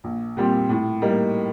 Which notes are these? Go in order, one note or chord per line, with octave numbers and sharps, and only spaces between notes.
A#1
A#2 G3 C4 G4
A2
G3 A#3 D#4